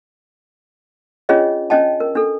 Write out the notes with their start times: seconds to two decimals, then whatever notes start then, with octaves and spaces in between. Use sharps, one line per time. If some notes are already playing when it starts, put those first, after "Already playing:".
1.29 C#4 D4 F4 G#4 C#5 D#5
1.70 C#4 D4 D#5 G5 A5
2.00 A#4
2.15 D4 A4